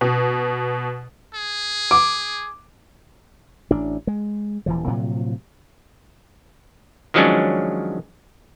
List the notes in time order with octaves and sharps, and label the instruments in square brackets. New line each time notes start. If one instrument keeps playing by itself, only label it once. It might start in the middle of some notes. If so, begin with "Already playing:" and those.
[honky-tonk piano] B2
[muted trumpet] G#4
[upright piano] D6
[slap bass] A1 D4
G#3
D#1 E3 F3
A2 C3 F3 F#3
[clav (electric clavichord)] D#3 F3 F#3 G#3 C#4 D4